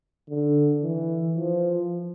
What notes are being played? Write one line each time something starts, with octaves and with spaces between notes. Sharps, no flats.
D3
E3
F3